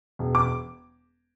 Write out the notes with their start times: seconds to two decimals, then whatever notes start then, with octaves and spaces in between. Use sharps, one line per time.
0.19 E1
0.35 D6